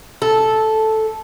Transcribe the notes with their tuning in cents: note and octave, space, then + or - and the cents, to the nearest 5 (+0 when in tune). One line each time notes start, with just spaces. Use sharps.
A4 -5